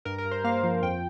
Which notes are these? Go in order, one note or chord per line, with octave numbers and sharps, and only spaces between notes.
G2 A#4
A#4
G2
C5
A#3 F5
F3
F2 G5